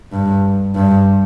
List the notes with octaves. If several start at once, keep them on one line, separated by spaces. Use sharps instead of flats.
G2
G2